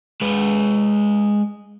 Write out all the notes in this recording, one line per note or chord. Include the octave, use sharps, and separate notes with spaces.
G#3 B4